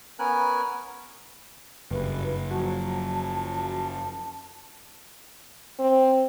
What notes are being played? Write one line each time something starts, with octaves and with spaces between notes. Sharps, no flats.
B3 C#4 A#4 G#5 F#6
F#1 G2 B4
F3 F#3 A5
C4